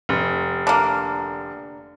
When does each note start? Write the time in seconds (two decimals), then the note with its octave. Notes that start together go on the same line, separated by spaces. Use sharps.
0.09 F1
0.67 D3 A#3